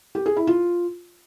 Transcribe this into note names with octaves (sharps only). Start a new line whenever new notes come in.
G4
G#4
E4
F4